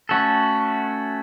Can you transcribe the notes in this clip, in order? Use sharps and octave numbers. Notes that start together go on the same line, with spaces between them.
A3 C#4 F#4 A4